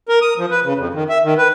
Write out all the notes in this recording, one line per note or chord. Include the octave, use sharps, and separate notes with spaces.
A#4
D#6
F3
B4
C#3
F2
D#3
E5
D#3
B4